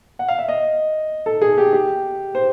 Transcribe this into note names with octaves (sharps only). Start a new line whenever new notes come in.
F#5
F5
E5
D#5
A4
G#4
G4
G4
C5